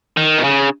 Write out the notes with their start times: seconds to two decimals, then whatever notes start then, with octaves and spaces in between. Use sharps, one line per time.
0.17 D#3
0.38 B2
0.44 C#3